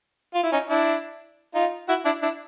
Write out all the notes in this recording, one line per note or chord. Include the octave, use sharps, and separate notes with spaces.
F4
E4
C#4 D#4
D4 E4
D#4 F4
E4 F#4
D4 E4
D4 E4